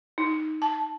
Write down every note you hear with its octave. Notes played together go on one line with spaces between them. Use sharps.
D#4
A5